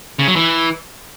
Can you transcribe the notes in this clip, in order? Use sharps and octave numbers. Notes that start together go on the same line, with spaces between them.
C#3
F#3
E3